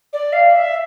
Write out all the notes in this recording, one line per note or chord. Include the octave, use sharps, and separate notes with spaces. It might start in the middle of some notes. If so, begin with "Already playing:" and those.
D5
F5
E5